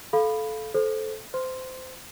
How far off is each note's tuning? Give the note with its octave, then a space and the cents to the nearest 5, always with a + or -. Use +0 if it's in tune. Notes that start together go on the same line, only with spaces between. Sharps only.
A4 -15 F5 +0 B5 +0
A4 -15 C5 +0
C5 -25 C6 +0